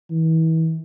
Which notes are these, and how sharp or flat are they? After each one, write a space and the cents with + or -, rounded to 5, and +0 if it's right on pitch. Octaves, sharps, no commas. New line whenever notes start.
E3 -35